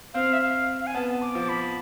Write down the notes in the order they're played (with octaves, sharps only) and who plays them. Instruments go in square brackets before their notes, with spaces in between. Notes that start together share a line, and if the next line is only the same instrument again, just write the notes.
[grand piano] C4 [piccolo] F5
[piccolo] E5
F5
F5
G#5
[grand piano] B3 [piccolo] A5
[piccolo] D6
[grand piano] F3
[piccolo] B5